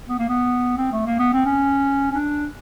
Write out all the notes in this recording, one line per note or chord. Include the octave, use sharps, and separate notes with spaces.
B3
A#3
B3
C4
A3
A#3
B3
C4
C#4
C#4
D4